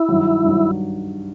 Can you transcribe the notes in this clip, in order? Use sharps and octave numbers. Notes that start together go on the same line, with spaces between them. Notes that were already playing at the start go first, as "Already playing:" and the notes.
Already playing: E4
G2 D#3 F#3
G2 D#3 F#3